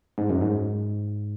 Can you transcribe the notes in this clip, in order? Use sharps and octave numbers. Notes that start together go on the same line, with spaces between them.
G#2
F#2
G#2